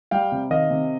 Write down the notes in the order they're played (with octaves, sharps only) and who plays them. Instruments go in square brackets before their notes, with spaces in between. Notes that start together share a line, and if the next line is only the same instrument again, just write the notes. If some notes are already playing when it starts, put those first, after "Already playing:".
[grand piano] G3 F5 G5
C3
D#3 D#5 F5
C3